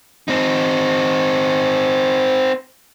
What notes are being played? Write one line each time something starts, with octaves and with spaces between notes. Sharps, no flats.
C4 D#4